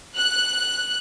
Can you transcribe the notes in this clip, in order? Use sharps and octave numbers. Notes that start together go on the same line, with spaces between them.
F#6